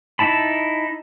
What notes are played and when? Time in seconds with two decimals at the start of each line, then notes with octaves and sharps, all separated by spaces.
0.19 D#4 E4 A5 B5